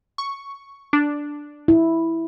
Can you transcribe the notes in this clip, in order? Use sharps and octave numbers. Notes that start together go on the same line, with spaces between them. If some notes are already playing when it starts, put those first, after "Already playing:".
C#6
D4
E4